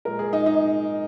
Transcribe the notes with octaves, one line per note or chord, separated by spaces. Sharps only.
A#2 G#3 A#4
G#4
D#4
D#4